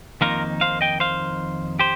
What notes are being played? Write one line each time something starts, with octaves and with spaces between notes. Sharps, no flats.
F2 D#3 A#3 D#4 F4 A#4
C5 F5
D#5 G5
C5 F5
G4 C5